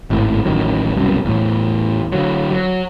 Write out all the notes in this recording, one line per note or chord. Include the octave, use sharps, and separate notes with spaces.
G#1 A2
A1 D#3 F#3
C2 F#2 B2
E2 A2
D3 F#3
F#3